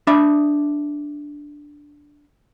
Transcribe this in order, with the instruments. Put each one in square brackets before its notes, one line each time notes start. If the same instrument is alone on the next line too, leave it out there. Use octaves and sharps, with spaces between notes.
[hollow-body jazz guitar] D4 E5 B5